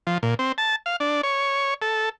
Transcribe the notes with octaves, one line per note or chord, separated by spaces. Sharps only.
F3
A#2
C4
A5
F5
D4
C#5
A4